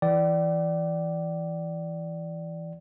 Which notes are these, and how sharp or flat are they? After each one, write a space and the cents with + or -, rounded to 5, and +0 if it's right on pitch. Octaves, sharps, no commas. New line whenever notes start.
E3 +0 D5 +0 G5 -45